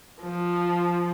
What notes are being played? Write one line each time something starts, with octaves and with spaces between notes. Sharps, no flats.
F3